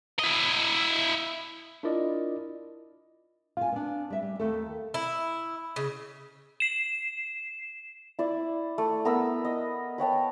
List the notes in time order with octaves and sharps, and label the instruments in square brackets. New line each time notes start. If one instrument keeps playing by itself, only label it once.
[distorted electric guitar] E4 D#5
[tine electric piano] D4 E4 F4 A#4 D5 D#5
[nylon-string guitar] F4 G#5 [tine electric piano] F5
[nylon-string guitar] B3 D4
G3 E5
G3
D#2 A3 A4
[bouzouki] E4
C#3
[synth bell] C7 E7
[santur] E4 D5
A3
B3 A#4 B4 E6
D#5
B4 C#5 G5 A5